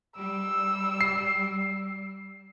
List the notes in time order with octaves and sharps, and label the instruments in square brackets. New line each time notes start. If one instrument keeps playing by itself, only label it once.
[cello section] G3 [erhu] E6
[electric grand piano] C7